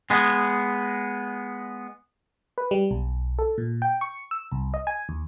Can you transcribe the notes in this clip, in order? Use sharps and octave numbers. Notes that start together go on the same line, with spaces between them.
G#3 B3
B4
G3
B1
A4
A#2
G5
C#6
E6
C2
D#5
G#5
D#2